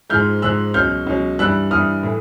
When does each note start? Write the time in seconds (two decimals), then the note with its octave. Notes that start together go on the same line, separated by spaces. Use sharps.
0.10 G#2 F3 G#3 F6 G6
0.42 G#2 F3 G#3 E6 F#6
0.74 C#2 B2 F#3 F6 G6
1.07 C#2 B2 F#3
1.39 G2 E3 G3 E6 F#6
1.71 G2 E3 G3 D#6 F6
2.03 A2 E3